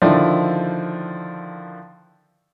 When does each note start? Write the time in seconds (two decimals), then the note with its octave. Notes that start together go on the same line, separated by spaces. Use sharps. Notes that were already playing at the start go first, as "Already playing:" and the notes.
0.02 D3 D#3 F3 E4 D5